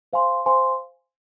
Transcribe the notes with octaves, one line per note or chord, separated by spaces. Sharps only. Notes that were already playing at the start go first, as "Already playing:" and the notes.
C5 F5 G#5 C6
C5 F5 G#5 C6